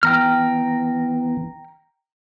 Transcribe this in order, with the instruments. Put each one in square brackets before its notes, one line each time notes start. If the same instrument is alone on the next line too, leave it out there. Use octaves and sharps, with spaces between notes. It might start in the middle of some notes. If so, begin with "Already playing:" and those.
[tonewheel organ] E3 B3 [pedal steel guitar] G5 A#5 F6